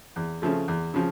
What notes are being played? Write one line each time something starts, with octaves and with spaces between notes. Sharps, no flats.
E2
C#3 F3 A3
E2
C#3 F3